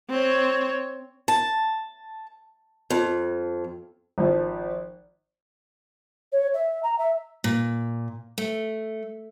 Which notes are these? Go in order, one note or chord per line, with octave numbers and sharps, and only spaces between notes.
C4 C#5
A5
F2
G#1 F3
C#5
E5
A#5
E5
A#2
A3